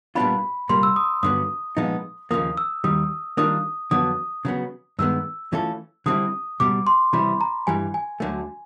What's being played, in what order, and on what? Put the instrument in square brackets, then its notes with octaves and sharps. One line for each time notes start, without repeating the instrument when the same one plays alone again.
[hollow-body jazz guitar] A#2 G3 B3 D4 F4 [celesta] B5
[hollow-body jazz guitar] C2 A#2 G3 A#3 [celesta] C6
[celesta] E6
D#6
[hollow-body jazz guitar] G2 D3 F#3 B3 [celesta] D#6
[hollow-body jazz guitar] A#2 F3 G#3 B3 D#4
[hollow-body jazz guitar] D#2 C#3 F3 A#3 [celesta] D#6
[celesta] E6
[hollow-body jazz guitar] D#2 D#3 G3 [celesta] D#6
[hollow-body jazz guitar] D#3 G3 A#3 D4 F4 [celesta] D#6
[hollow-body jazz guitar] F2 D3 F#3 B3 [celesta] D#6
[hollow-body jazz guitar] C#3 F#3 B3
[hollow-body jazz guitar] G2 D#3 G#3 B3 [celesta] E6
[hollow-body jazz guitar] E3 A3 C#4 F4 A4
[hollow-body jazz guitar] D3 G3 C4 E4 [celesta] D#6
[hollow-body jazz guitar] C#2 B2 G3 [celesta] D6
[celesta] C6
[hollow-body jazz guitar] C3 E3 G3 [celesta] B5
[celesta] A#5
[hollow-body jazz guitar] G2 E3 G3 [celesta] G#5
[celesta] G#5
[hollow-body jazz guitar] D2 D3 F#3 A3